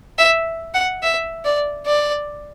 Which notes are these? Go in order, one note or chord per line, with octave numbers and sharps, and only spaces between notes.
E5
F#5
E5
D5
D5